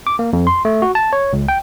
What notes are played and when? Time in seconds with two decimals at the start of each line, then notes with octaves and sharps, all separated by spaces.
0.07 D6
0.19 A#3
0.33 F2
0.47 C6
0.65 A3
0.82 F#4
0.95 A5
1.13 C#5
1.33 C#2
1.48 G5